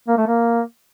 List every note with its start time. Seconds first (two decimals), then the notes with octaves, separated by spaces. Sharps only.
0.08 A#3
0.18 A3
0.27 A#3